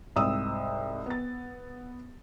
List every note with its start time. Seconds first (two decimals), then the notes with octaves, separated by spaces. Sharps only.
0.16 C2 G#2 D#6 E6
1.06 B3 A6